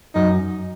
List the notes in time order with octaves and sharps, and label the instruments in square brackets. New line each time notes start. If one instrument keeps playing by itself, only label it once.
[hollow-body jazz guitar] F#2 [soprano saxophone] D#4